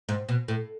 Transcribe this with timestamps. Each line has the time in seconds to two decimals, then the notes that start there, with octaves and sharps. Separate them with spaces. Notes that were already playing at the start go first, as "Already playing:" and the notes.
0.09 G#2
0.29 B2
0.48 A2